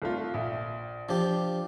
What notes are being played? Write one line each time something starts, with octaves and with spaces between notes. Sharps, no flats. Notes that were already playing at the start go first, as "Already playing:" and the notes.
C2 A3 F4
A#1 E5
F3 D4 G4